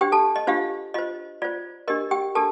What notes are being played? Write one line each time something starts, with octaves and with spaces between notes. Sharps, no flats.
D4 G4 C5 G5
A4 A5
D#5
D4 F4 G4 C5 F5
F4 C5 D#5
F4 C5 D5
D4 G4 A#4 D#5
G4 G5
D4 G4 A4 A#4 A5